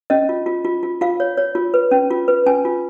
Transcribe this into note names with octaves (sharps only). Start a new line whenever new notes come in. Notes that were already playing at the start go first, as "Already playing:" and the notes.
C#4 D#5
F4
F4
F4
F4
F4 F5
C#5
C#5
F4
B4
C#4
F4
B4
C#4 G#5
F4